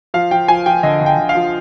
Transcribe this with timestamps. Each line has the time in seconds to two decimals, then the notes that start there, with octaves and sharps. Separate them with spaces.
0.14 F3 F5
0.31 F3 G5
0.48 F3 G#5
0.66 F3 G5
0.83 D3 D#5
1.01 D3
1.06 G5
1.18 D3
1.29 F5
1.35 F3